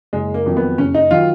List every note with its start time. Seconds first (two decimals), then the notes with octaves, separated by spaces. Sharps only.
0.13 F#1 G#3
0.34 A#3
0.46 F2 D#3 F#3
0.57 B3
0.78 F#1 C#4
0.95 D#4
1.11 D#3 F#3 F4